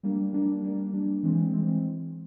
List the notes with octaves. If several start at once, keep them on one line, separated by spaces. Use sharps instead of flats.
G3 A#3 D4
G3 A#3 D4
G3 A#3 D4
G3 A#3 D4
E3 G#3 C4
E3 G#3 C4